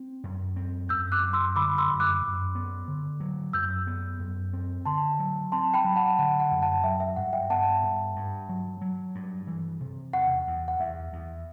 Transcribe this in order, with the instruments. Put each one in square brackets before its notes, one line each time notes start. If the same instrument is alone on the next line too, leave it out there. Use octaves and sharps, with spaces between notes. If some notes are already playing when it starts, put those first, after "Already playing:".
Already playing: [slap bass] C4
F#2
C4
[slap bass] F#2 [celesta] E6 G6
[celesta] D6 F#6
[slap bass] F#2
[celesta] C6 E6
[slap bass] D3 [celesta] B5 D6
[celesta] C6 E6
[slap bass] F#2
[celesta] D6 F#6
[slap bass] F#2
B3
D3
F#3
[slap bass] F#2 [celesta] E6 G6
[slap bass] B3
F#2
C4
[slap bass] D3 [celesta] A5 C6
[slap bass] F#3
[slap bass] C4 [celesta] A5 C6
[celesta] G5 B5
[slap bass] F#3
[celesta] F#5 A5
[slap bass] D3 [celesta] F#5
[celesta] F#5
[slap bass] F#2
[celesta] F#5 A5
[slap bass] F#3 [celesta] E5 G5
[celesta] E5
[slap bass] G2 [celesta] F#5
[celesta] E5 G5
[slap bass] B3 [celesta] F#5 A5
[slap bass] G2
G2
F#3
F#3
G2
E3
C3
[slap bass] E2 [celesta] F#5
[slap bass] E2
[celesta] F#5
[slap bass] E2 [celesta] E5
[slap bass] E2